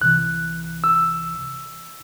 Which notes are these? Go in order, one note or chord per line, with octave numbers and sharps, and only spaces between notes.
C2 C3 E3 F#6
E6